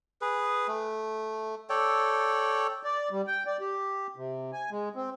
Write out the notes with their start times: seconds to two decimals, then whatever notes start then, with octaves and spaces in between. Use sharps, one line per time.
0.21 G#4 B4
0.67 A3
1.70 A4 C#5 D5 G5
2.83 D5
3.10 G3
3.27 G5
3.46 D5
3.61 G4
4.16 C3
4.53 G#5
4.71 G#3
4.95 C4